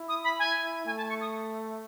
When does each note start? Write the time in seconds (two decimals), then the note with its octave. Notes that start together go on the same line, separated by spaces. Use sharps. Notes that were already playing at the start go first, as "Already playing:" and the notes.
Already playing: E4
0.09 D#6
0.24 B5
0.39 G#5
0.86 A3 G#5
0.97 A5
1.09 C#6
1.21 D#6